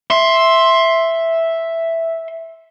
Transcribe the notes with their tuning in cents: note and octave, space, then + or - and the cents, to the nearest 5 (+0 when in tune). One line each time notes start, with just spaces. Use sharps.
E5 +0 C6 +10